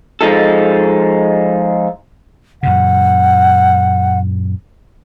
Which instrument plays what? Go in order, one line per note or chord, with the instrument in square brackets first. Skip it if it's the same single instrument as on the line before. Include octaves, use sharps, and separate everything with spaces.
[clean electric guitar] F3 G#3 D#4 A4
[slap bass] F#2 A#2 C#3 [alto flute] F#5